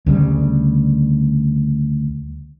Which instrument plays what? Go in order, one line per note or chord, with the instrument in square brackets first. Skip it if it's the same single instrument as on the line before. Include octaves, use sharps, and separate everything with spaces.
[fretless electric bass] D2 C#3 E3 G3